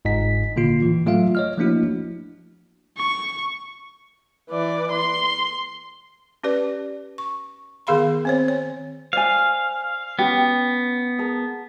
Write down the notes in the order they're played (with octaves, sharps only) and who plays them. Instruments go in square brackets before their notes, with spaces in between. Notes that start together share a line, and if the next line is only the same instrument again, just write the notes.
[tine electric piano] G1 G#2 D#5 B6
A#2 D3 A#3 F4 C7
A2 E3
F#3 A3 F4 E5 F5
C#5 D#5 F6
F3 A3 A#3 D4 E4 F#4
[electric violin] C#6
[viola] E3 D5
C6
[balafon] C#4 G4 B4 D5
C#6
D#3 B3 G#4 F5 B5 C6
C4 C5 C#5
C#5
[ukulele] C5 D5 G#5 [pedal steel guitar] F5
[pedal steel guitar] B3 [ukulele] C#4 G4 G5
[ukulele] G#4 A#4 A5